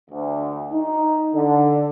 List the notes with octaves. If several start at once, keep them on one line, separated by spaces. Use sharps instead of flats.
D2
D#4
D3